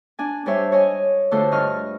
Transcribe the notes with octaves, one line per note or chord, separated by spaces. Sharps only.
D4 G#5
G3 D4 G4 C5 C#5 E5
C#5 D#5 G#5
D3 A3 F4 F#4 A4 C5
G2 D#5 C#6 F6